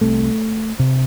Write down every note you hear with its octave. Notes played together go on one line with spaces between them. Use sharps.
C2 C3 A3
C3